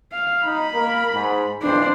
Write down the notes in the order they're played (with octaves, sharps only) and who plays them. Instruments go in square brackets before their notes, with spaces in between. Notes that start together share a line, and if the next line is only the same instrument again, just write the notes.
[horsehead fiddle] F5
[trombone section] D#4 [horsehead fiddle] B5
[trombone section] A#3 A#4
G#2
[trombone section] B1 F2 E3 [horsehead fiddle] D4 C5